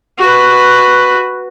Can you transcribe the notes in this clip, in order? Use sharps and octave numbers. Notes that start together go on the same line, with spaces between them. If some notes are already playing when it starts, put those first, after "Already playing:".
F#4 B4